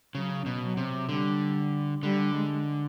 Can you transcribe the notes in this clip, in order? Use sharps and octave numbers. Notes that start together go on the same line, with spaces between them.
C#3 F#3
B2
F#3
C3
D3 G3
D3 G3
G#3